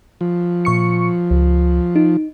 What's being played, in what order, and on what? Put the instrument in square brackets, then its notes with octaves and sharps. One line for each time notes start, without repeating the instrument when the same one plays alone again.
[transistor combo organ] F3
[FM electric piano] A#2 C#6 C#7
C#2
D#4